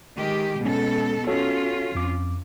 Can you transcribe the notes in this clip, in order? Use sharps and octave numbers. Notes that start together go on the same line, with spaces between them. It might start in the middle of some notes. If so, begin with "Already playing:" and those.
D#3 G#3 G4
B2 G#3 C#4 A4
C#4 F4 F#4 A4 C#5
F2 D6